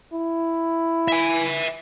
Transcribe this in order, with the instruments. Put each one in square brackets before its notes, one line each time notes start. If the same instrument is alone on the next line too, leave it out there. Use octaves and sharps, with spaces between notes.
[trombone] E4
[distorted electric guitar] E5 G#5